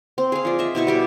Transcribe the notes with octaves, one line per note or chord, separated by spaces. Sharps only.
C4
G#4 F5
F3 D5
D#5 E5
B2 E4 E5 C#6
G3 G4 D5